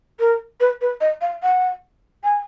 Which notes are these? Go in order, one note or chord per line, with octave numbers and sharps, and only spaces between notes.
A#4
B4
B4
D#5
F5
F#5
G#5